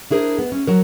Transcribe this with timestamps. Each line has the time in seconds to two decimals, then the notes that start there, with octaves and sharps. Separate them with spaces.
0.11 D4 E4 G#4 A#4 C5
0.39 B3
0.52 C#4
0.67 F#3 A#4